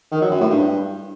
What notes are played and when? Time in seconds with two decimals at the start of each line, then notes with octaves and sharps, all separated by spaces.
0.11 D#3
0.21 F#3
0.31 F#2
0.40 A2
0.50 G2